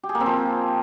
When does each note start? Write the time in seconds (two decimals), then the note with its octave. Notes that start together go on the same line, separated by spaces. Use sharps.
0.03 G4
0.09 G#4
0.15 A#3
0.20 C4
0.26 F3